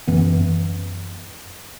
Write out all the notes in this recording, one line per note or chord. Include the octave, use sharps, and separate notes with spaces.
F#2 E3 B3